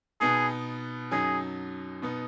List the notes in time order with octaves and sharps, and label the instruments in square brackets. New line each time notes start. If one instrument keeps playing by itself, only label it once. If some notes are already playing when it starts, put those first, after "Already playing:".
[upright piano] B2 B3 D#4 [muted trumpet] G#4
[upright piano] F#2 F#3 D#4 [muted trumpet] G#4
[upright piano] B2 B3 D#4